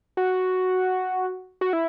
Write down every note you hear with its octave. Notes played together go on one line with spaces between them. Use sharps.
F#4
F#4
E4